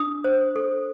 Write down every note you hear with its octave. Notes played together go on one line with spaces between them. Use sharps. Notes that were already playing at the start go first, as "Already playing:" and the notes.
Already playing: D4 D#6
C5
A4